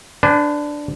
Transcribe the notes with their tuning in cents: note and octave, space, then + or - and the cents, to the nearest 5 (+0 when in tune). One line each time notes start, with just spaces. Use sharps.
D4 +0 B4 +40 G#5 +0